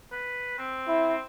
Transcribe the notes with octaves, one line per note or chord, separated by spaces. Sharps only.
B4
C4
E4